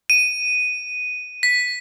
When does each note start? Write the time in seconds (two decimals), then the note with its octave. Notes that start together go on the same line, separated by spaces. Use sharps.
0.10 D#7
1.43 B6